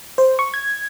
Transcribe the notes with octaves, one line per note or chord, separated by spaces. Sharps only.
C5
C#6
G#6